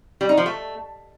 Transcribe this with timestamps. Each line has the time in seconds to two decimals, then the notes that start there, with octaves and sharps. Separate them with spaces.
0.21 G3
0.29 D#4
0.37 F3
0.46 A3